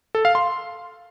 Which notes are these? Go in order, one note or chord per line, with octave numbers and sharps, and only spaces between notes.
A4
F5
C6